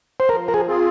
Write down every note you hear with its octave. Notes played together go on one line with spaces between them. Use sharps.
C5
F3 A#4
A#4
G#4
C4 F4 G#4